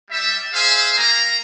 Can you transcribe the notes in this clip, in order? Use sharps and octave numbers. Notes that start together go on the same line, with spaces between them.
G3 E5
G#4 C5 E5 F5 G#5
A#3 A#5